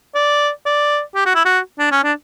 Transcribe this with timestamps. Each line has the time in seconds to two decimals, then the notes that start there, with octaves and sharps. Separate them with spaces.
0.15 D5
0.66 D5
1.15 G4
1.26 F#4
1.35 E4
1.45 F#4
1.79 D4
1.92 C#4
2.04 D4